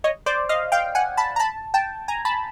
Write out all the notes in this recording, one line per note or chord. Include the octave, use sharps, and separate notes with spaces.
C#5 D#5
C5 D5
D#5 F5
F5 G5
F#5 G#5
A5 B5
A#5
A5 B5
G5 A5
G#5 A#5
A5 B5